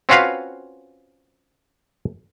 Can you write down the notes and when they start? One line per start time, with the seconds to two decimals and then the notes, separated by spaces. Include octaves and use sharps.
0.09 C4 C#4 F4 F#4 B4 F5